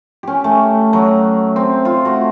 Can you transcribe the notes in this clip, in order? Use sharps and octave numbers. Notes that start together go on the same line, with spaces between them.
C#4 G4
A3
F#3
C4
F4
A3 F#4